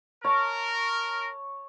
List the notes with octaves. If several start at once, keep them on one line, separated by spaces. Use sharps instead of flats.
A#4 C#5 A5